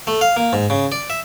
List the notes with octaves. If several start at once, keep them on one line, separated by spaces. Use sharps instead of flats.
A3
F5
A#3
G#2
C#3
D5
E5